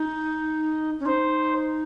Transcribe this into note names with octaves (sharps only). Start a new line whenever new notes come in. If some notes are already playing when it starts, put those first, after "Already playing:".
Already playing: D#4
C#4
D#4 C5